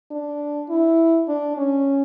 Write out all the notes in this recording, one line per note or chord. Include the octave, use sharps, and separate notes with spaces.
D4
E4
D4
C#4